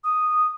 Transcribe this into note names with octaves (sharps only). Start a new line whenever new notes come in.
D#6